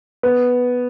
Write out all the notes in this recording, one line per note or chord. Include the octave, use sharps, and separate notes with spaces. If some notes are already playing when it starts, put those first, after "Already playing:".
B3